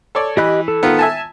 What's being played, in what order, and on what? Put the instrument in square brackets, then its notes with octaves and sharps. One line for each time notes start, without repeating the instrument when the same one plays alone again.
[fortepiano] A4 C#5 D5
[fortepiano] E3 B5 [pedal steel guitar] G4 D#5 F#6
[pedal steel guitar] A4
[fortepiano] D#3 B3 F4
E5 G#5 A5